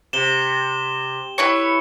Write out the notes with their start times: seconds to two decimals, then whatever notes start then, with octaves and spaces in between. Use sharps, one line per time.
0.13 C3 E7 G7
1.38 E4 B4 C#5 C#7